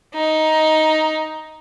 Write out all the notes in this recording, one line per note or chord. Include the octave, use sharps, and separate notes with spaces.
D#4